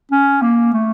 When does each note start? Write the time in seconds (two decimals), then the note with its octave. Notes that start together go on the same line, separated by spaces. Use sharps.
0.12 C#4
0.42 A#3
0.73 A3